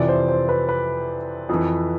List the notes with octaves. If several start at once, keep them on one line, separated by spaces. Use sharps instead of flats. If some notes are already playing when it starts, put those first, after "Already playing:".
Already playing: F2 C3 E3 D5
C5
C5
B4
B4
F2 E3